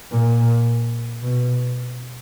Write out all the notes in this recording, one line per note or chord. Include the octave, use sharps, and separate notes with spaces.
A#2
B2